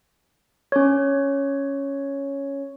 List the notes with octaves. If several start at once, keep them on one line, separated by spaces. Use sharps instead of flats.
C#4 C#5